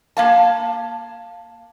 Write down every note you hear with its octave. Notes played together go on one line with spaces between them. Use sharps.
A#3 F5 A5